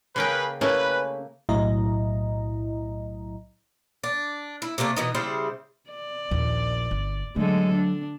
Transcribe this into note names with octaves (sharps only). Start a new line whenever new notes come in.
C#3 A#3 C#4 G#4 B4 G5
A3 A#3 C#4 E4 G#4 B4
B1 A2 F#3 E4 D#5 A#5
D4
E4
C3 A3 A#3 D4
B2 E3 D#4
C#3 G3 E4 C5
D5
A#1 D#2
G1
D3 F#3 G#3 A3 A4
D4